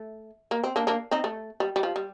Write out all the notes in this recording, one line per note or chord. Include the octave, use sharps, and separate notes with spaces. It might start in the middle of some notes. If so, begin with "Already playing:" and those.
Already playing: A3
A#3
C4
A#3 D4
A#3 D4
C4 D#4
A3
G3
G3
F3
G3